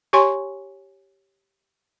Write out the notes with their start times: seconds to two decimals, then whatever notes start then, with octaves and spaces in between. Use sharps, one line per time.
0.13 G4 C#5 G#5 C6 C#6